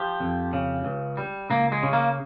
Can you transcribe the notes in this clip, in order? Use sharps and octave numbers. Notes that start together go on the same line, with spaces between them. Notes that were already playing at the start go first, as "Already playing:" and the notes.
Already playing: F3 G4
F2
C#3
C#2
G3
C#2 A#3
G#3
C#3
A#3